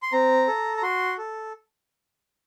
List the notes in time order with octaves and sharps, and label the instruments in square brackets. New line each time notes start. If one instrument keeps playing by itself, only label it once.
[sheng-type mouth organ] C6
C4 A#5
A4
A#5
F#4 C6
A4